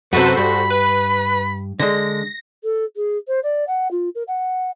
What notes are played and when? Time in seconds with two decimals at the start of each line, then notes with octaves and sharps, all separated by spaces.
0.13 F#2 C3 F#4 A4 B4 C5
0.37 G2 B5
0.70 B4
1.79 D3 G#3 A#6
2.63 A4
2.96 G#4
3.27 C5
3.43 D5
3.67 F#5
3.91 F4
4.15 A#4
4.28 F#5